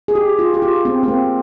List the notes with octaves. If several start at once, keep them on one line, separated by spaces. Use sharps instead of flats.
G#4
G4
F4
G4
F4
C4
C4
A#3